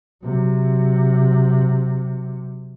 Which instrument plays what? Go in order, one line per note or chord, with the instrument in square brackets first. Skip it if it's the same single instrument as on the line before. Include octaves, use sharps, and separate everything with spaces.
[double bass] C3 F#3